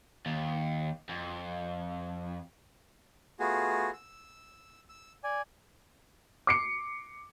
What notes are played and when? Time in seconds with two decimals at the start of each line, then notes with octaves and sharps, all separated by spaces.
0.26 D#2
1.09 F2
3.40 A3 B3 F4 F#4 G#4
3.94 E6
4.89 E6
5.24 D5 G#5
6.47 D6 C7 C#7